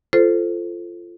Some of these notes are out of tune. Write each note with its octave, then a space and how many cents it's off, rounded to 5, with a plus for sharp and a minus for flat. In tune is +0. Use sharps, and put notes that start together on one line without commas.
F4 -15 A4 +0 C5 -10